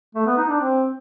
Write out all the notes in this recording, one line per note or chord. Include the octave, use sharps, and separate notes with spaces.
A3
B3
D#4
D4
C4